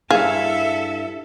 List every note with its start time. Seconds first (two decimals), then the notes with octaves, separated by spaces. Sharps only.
0.11 G2 E4 G#4 A4 E5 F5